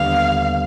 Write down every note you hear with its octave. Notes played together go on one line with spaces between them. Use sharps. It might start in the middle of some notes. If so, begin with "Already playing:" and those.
Already playing: D#2 D3 G3 B3 F5